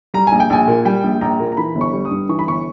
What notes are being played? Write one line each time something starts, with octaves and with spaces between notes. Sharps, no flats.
G3 A#5
A#1 G#5
G5
A#1 G#5
A#2
G3 G5
A#1
A#1 A#5
A#2
A#5
E3 B5
G1
C#6
G3
D#6
G2
E3 C#6
B5
G1 C#6